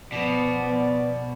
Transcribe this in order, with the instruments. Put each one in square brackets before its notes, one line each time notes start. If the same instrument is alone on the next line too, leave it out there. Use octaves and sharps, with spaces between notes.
[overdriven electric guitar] B2 [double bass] F3 B3 [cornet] D5